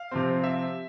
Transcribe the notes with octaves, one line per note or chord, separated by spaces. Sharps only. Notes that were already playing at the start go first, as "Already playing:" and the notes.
Already playing: F5
C3 F3 C4
E5